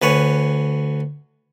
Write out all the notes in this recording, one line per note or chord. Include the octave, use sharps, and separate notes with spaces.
D2 B4 C#5 G#5